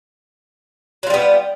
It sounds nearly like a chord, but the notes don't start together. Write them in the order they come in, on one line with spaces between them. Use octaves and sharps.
F#3 F4 G3 B3